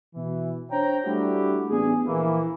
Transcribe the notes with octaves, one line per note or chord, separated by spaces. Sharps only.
B2 E3
D4 C5 C#5 G5 A#5
G3 A3 D4 E4 F#4 G4
A1 B3 D4 G#4
A#1 E3 A#3